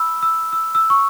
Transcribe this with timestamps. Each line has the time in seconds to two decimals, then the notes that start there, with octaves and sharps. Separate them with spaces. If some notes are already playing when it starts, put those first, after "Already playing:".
Already playing: B5 E6
0.23 E6
0.53 E6
0.75 E6
0.90 C#6